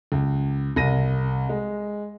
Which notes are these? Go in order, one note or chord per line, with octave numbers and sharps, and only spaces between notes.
C#2
C2 A#6 D#7
G#3